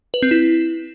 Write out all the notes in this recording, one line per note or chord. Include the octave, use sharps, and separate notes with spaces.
B4
C4
E4